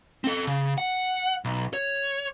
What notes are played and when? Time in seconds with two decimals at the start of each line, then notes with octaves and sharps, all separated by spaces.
0.24 C4 A4
0.47 C#3
0.78 F#5
1.45 B1
1.73 C#5